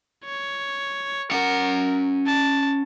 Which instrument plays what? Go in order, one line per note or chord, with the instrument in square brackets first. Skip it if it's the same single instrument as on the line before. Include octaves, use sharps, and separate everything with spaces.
[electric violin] C#5
[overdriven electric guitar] C#4 F#5 [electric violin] A#4
[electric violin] A5